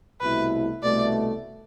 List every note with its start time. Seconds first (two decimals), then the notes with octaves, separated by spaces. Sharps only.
0.21 C2 B2 A3 E4 B4
0.83 C2 B2 A3 D5